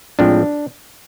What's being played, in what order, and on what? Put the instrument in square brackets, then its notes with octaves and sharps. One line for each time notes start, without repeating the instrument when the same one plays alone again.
[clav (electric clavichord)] A2 F3 G#3 C4 D4